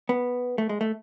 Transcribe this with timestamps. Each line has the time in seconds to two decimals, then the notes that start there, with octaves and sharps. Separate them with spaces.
0.09 B3
0.58 A3
0.69 G#3
0.81 A3